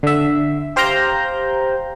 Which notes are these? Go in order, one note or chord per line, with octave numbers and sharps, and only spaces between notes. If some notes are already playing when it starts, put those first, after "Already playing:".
D3 E5
G4 C5 F5 G5 A#5 G6